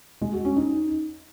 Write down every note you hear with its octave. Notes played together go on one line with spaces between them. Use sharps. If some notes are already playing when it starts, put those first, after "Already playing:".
G#3
F#4
C#4
D#4